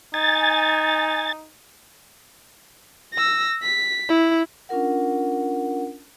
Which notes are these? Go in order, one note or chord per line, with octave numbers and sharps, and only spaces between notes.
D#4 G#5 A6
E6 A#6
B6
E4
C#4 D4 F4 A#4 F#5